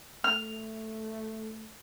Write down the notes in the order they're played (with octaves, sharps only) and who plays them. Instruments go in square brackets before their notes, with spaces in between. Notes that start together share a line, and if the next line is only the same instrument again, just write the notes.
[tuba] A3 [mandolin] F6